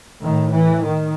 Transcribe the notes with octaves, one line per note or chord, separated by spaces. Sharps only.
A2 D#3
E3
D#3